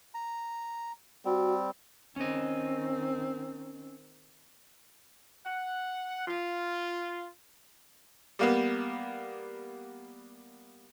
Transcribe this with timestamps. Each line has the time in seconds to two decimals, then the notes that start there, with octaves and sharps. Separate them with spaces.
0.14 A#5
1.25 G3 C4 F#4
2.16 D#3 C4 C#4 D#5
5.45 F#5
6.27 F4
8.39 G3 A#3 B3